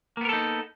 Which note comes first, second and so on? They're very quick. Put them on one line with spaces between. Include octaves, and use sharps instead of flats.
A#3 B3 A#4 A4 D#4